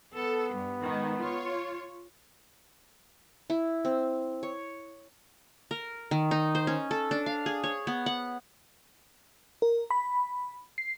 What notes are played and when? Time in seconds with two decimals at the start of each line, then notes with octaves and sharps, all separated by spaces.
0.14 B3 A4
0.53 G2
0.82 G#2 D#3
1.21 F4 C#5
3.50 E4
3.85 C4
4.43 C#5
5.71 A#4
6.11 D#3
6.31 D#4
6.55 C5
6.67 C#4
6.91 A4
7.11 D4
7.26 F5
7.46 G#4
7.64 C#5
7.87 B3
8.06 F#5
9.62 A#4
9.91 B5
10.78 C7